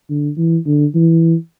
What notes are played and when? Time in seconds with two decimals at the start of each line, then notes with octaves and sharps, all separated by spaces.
0.10 D3
0.38 E3
0.66 D3
0.95 E3